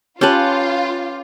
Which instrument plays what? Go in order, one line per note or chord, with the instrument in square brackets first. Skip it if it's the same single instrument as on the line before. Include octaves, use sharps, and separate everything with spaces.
[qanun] C#4 B4 [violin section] F4 [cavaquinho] G4 A5